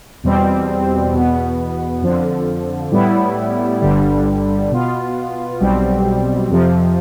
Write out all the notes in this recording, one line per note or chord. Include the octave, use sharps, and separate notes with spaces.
E2 B2 G3 C4
E2 B2 B3
F2 D3 F3
A2 G3 B3 E4
G1 G2 D3 G3
B2 B3 F4
B1 B2 G3 C4
F2 C3 F3